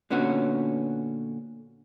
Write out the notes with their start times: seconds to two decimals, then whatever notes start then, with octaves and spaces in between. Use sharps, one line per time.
0.10 A#2 D3 B3 C#4 F#4